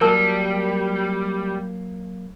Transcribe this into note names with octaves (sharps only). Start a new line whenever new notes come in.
F#3 G3 A#3 A#4 A5